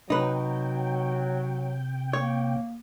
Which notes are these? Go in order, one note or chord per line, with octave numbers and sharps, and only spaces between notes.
C3 F#3 D#4 B4 G5
A#3 C#5